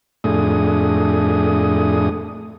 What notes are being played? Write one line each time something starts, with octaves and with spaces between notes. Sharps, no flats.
F2 A2 A3 D4 G#4 D#6